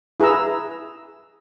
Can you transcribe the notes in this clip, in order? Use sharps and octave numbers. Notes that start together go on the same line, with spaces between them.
E4 G#4 B4 A#5 E6